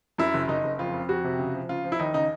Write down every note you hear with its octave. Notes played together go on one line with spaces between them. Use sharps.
F#2 E4
F#1
F#1 D#4
F#1
F2 F4
F2
F2 F#4
C3
C#3
F3
C#3 F4
F3
E4
D#2 D#4
C#3 D#4